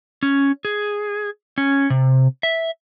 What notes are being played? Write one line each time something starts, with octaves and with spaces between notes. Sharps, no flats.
C#4
G#4
C#4
C3
E5